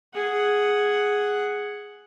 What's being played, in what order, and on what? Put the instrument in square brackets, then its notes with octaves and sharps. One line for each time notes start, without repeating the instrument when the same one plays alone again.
[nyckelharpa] G#4 F#5